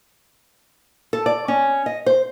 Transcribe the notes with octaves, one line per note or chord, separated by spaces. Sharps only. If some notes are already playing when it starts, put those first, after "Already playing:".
A4
D5
C#4
D#5
C5